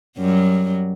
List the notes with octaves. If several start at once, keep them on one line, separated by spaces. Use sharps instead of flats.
F#2 F#3 G3